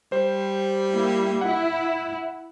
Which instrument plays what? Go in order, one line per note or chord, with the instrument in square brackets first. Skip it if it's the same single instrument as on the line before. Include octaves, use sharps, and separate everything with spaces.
[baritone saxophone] G3 [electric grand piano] C5
[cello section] A#3 E4
[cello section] E4 [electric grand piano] F#5